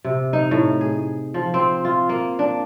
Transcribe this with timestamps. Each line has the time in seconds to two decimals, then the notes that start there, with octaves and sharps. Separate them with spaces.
0.04 C3
0.33 D#4
0.51 A2
0.81 G#4
1.34 F3
1.54 C4
1.85 F4
2.09 A#3
2.39 D4